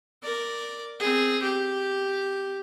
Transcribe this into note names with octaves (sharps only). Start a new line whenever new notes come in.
A#4 D5
C4 G#4
G4